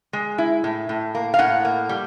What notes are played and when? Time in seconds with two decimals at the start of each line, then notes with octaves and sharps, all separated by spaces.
0.13 G#3
0.38 E4
0.64 A2
0.89 A2
1.15 A#3
1.34 F5
1.39 A2 F#5
1.65 A#3
1.89 G3